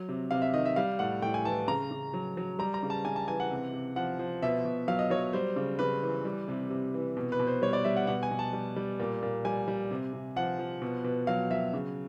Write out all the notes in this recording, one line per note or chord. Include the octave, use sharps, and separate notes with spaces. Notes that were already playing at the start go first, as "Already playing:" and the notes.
Already playing: F#3
C3
C3 F5
E5
D#3 D#5
E5
G3 F5
A2 F#5
A2 G5
G#5
E3 A5
C#3 A#5
C#3
F#3
F#3
G3 A#5
A#5
C#3
A5
C#3 G#5
A5
E3 G#5
F#5
C3
C3
F3 F#5
F3
B2 E5
B2
F#3 F5
D#5
F#3 C#5
G3 C5
C#3
C#3 B4
E3
G3
C3
C3
E3
B2
B4
B2
C5
G3 C#5
D5
G3 E5
F#5
B2 F#5
G#5
B2
A5
G3
G3
A#2
A#2
G3 G#5
G3
C3
C3
F3 F#5
F3
B2
B2
F#3 F5
F#3 E5
C#3